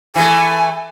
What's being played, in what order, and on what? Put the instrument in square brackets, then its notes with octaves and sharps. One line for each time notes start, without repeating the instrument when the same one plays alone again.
[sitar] E3 A3 [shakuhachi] G#5